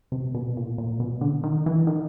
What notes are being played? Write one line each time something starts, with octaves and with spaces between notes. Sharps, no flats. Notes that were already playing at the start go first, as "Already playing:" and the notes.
C3
B2
A#2
A#2
B2
D3
D#3
E3
D#3